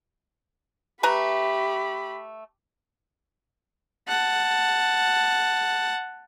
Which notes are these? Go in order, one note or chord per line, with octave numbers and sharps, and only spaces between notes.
A3 G4 B4 A#5 B5
F#5 A5